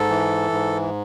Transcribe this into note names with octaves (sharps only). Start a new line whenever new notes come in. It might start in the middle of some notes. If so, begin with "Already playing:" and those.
Already playing: G#2 A4
E3
G#2